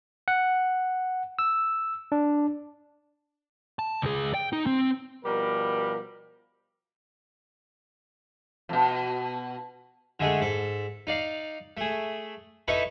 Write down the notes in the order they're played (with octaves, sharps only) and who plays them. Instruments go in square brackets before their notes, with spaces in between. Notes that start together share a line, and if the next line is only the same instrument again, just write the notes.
[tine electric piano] F#5
E6
D4
[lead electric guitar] A5
C#2 G#4
G5
D#4
C4
[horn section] B2 F3 G3 G4 A#4
[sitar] F2 B2
[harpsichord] D3 G#3 A3 G#4
G#2 A4
D#4 D5 F5
A3 G#4
D#4 E4 A4 B4 C#6